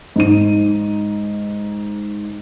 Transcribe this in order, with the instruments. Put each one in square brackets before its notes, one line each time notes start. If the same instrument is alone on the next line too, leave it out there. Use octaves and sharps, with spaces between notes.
[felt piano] G#2 D#4 D#7